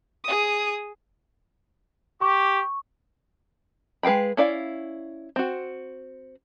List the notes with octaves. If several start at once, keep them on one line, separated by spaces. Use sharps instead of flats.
G#4 D#6
G4 C#6 D6
G#3 B4 F5 G5 B5
C#4 E4 D5 F5
C4 F#4